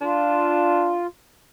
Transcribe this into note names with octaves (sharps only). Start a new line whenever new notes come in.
D4 F4